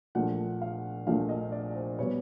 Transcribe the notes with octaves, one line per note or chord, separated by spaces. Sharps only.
A#1 A#2 F3 A3 F#5
F5
A#1 A#2 F3 A3 F5
D#5
D5
C5
B2 G3 B3 C#5